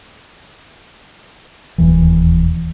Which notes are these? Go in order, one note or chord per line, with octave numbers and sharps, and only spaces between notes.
E1 D#2 E3